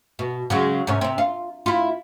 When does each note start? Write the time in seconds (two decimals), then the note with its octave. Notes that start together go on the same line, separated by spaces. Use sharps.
0.19 B2
0.50 C#3 F#3 G#3
0.87 G#2 C3 C#4
1.01 C3 C4
1.18 F4
1.66 E4 F4